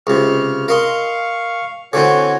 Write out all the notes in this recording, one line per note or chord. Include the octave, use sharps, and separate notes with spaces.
C#2 C3 F6
A#4 D#5 F5 C6 C#6
D3 E3 C4 F#4 C#5 G#5